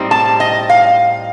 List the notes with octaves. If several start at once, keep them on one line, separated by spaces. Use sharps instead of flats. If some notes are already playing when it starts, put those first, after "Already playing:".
Already playing: A2 G3 C4 D#4
A5
D#5
F5